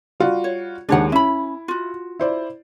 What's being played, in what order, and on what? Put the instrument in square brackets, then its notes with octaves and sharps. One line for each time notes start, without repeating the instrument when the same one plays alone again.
[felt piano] G3 F4 F#4
[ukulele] C#5
[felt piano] D#2 G#3 [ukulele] D4 C#5 F#5
[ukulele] C#4 B5 [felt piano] E4
[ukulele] F4 F#4
[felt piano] E4 C5 D5